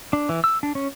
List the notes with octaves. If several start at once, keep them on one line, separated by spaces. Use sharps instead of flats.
D4
E3
E6
D4
C#4